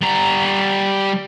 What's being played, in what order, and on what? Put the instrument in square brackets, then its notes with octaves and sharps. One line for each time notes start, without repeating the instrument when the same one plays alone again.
[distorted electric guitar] G3 A#5